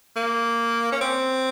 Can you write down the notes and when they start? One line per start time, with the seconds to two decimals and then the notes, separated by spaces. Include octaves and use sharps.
0.16 A#3
0.92 C#4
1.01 C4